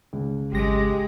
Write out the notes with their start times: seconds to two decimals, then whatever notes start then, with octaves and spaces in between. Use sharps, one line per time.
0.13 C#2
0.53 G#1 G#3 G4 A#6